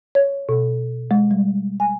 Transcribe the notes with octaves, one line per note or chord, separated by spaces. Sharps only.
C#5
B2
G#3
G3
G#5